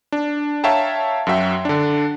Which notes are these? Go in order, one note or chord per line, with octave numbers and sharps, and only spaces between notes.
D4
C#5 E5 F5 G5 A5 A#5
F#2 F#3 F#4 E5 G5
D3 D4